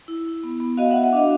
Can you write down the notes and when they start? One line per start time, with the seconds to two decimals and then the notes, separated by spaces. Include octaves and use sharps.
0.08 E4
0.26 E4
0.44 B3
0.60 B3
0.77 F#4 D#5 F5
0.91 E5 F#5
0.96 F#4
1.04 E5 F#5
1.13 D4 D#5 F5